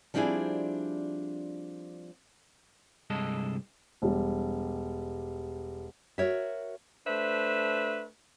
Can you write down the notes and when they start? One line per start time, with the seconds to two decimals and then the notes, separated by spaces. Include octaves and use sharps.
0.14 F3 G3 C4 D4 E4 G#4
3.10 C2 G2 C3 G#3 A4 D#5
4.02 E1 G3
6.18 F#4 A#4 C#5 E5
7.07 A3 D4 B4 C5 E5